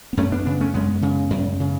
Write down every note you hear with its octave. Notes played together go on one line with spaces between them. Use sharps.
B3
F#2 A3 C#4
B3 D4
C#3 B3 D4
A3 C#4
F#2 G#3 B3
C#3
F#2
C#3